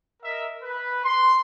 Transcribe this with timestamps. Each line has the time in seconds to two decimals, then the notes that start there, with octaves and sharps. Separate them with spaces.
0.23 A#4 D#5 E5
0.62 B4
1.04 C6